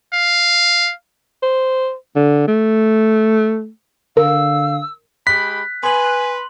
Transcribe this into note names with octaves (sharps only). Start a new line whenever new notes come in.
F5
C5
D3
A3
D3 A#4 F5 E6
G#3 G4 B5 F#6 B6
B4 G#5 C6 F#7